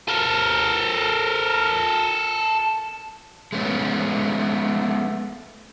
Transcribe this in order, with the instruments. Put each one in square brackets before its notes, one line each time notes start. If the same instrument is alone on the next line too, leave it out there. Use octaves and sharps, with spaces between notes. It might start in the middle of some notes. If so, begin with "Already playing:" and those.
[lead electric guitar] A4 A#4
[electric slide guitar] G#3 A3 B3 C#4